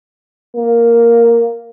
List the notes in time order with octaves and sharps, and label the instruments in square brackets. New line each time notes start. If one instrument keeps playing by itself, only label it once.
[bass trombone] A#3